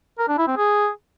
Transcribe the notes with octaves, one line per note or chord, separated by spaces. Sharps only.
A#4
D4
E4
C4
G#4